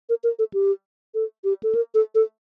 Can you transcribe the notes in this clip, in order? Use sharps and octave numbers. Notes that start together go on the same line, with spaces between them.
A#4
A#4
A4
G4
A4
G4
A4
A#4
A4
A4